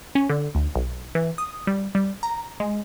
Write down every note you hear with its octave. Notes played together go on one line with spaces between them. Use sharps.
C#4
D3
D2
B1
E3
D#6
G3
G3
A#5
G#3